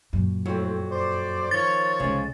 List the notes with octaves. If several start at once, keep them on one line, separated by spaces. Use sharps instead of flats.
F#2 A#2
F2 A2 F#3 C4
C5 D5
D#3 F3 C#5 A6
C2 C#3 G#3